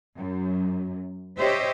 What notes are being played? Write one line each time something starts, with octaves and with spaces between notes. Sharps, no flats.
F#2
G4 C5 C#5 D#5 E5